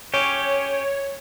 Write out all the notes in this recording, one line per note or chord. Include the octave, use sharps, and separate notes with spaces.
C#4 G4 C#5